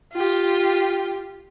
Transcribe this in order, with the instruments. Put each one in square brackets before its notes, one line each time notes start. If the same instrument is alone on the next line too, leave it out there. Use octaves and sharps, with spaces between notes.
[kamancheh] F4 G4